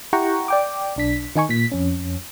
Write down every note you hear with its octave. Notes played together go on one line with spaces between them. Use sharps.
E4 G4 F#5 G5 A#5 C#6
D5 G5 D6
B1 D4 B6
D#3 D#4 G#5 C#6
A#2 B6
F2 C#4